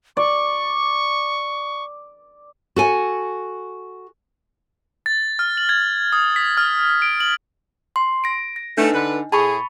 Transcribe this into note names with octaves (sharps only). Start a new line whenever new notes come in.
D5 C#6
F#4 A4 G#5
A6
F6
F#7
G#6
D#6
B6
F6
D7
F#7
C6
A#6 D7
A#6
A3 B3 D4 D#4
D3 B4
A2 G#4 A5 B5 C#6